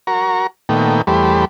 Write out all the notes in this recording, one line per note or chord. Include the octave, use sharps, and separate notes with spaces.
F#4 A#4 A#5 C#6
A#2 D#3 A3 B3 G5
E2 G3 A3 G4 C5 B5